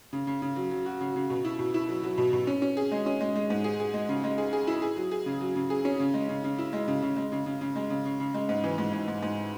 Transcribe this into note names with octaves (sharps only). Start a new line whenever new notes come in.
C#3
C#3
C#3
F#3
F#3
F#4
C#3
C#3
B2
E4
B2
E4
F#3
F#3
B2
B2
C#4
C#4
G#4
G#3
C#4
G#3
G#3
G#2
G#4
G#4
G#3
C#3
G#3
G#4
G#4
E4
G#4
F#3
G#4
C#3
F#3
C#3
G#4
C#4
C#3
G#3
C#3
C#3
E4
G#3
C#3
C#3
G#3
C#3
C#3
C#3
G#3
C#3
C#3
C#3
G#3
G#2
E3
G#2
G#2
G#2
G#2